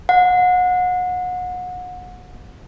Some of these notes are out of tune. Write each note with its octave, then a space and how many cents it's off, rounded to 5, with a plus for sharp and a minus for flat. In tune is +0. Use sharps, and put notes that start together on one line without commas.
F#5 -30